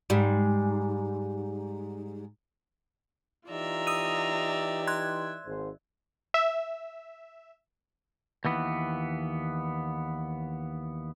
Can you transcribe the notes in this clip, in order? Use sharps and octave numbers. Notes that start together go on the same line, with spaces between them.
G#2 G3
E3 D#4 F4 G4 D5 E5 A#5
D#6 E6 D#7
C6 F#6 G#6
G#1 G#2 C5
E5
D#2 E3 B3